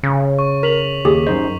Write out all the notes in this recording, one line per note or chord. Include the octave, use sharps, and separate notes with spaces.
C#3
C#6
A#4 B6 F7 F#7
D#2 G4 G#4
F#2 D#4 C5 D#5